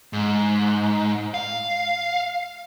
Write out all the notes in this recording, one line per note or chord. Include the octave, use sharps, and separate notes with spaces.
G#2
F5